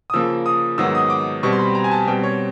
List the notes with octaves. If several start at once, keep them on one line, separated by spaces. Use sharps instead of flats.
D#6
C#3 F3 A#3 E6
D#6
G#2 D#3 F#3 B3 E6
D#6
D6
B2 G3 C4 C#6
C6
B5
A#5
G#5
A5
B2 G3 C4 G5
C#5